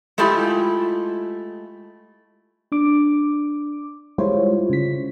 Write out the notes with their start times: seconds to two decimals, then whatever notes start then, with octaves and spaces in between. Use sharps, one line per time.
0.18 G#3 A3 E4 F4 G4
2.72 D4 D6
4.18 G3 G#3 E4 F4 C5 C#5
4.70 C#3 B6